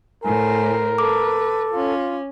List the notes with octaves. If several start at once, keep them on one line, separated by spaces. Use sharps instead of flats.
A2 A#4 C5 G#5
A4 B4 D6
C#4 F4